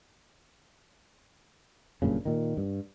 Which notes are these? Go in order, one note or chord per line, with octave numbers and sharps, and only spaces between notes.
F#1 G2 A#2 C#3
A#2 D#3
G2